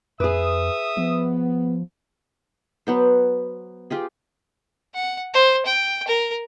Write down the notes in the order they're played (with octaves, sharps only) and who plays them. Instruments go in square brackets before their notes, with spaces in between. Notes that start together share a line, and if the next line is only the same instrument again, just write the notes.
[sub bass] F2 [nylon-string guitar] G#4 B4 [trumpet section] E5 D#6
[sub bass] F3 [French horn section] B3
[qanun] F#3 B3 C5
F4 G4 G#4
[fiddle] F#5
C5
G5
A#4